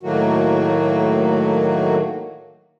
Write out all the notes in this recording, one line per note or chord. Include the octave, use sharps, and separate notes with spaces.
A2 D#3 F#3 A3 A#3 F#4